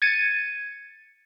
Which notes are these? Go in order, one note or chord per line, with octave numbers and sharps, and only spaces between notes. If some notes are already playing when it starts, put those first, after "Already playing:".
G#6 A6 C#7 D#7